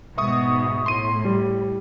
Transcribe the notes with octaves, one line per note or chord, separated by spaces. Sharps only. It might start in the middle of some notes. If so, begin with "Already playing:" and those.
G#2 B2 E5 C#6 D#6
A2 C6 D#7
G3